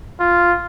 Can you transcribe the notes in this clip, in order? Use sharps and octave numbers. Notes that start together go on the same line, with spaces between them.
F4